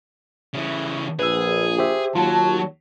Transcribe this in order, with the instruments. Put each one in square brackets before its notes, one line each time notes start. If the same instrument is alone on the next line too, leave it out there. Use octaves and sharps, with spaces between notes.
[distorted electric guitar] C#3 E3
[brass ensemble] A#1 [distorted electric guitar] G#4 [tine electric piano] B4 E6
[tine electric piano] G4 C5 E5
[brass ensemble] D#2 A5 [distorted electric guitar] F#3 [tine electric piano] F4